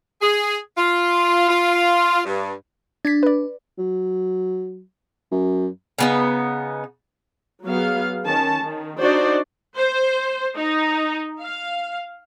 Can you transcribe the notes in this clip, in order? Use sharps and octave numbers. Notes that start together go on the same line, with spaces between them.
G#4
F4
F4
G2
D4 G#6 A6 B6
B4 D5
F#3
F#2
C#3 B3 D#4
F#3 B3 G#4 F5
D#3 C#4 A5
D#3
D4 D#4 F#4 C5 D5
C5
D#4
F5